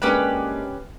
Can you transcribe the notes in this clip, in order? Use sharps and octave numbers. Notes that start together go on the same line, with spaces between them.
G#3 A#3 C#4 D4 G4 B4